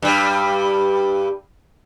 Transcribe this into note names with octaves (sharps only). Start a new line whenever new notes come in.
G2 G3